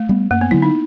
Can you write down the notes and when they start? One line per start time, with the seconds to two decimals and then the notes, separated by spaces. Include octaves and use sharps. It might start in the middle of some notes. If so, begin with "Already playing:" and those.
Already playing: A3
0.09 G3 B3
0.31 F#2 A#3
0.41 B3
0.51 D3 F#3 E4
0.62 D#4